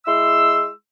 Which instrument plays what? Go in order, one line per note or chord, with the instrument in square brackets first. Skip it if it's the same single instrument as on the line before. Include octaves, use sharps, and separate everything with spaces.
[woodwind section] G#3 E4 C6 E6